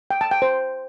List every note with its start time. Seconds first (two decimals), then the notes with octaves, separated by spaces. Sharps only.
0.11 G5
0.21 A5
0.31 G5
0.42 C5